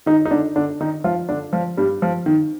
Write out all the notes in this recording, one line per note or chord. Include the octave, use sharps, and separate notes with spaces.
D#3 D#4
D#4
D3 D4
D3 D4
D#3 D#4
F3 F4
D3 D4
F3
G2 G3
F3
D#3